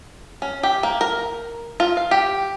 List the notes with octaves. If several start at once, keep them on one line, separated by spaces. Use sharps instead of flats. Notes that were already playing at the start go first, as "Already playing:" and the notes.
C#4
G4
A#3
A#4
F4
F5
G4